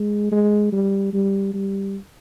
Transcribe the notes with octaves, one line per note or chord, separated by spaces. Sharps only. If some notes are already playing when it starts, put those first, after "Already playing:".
Already playing: G#3
G#3
G3
G3
G3